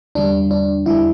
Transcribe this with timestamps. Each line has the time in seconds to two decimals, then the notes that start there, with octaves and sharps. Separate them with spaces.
0.15 E2 D3 G3 D4
0.51 D4
0.86 E2 D3 G3 E4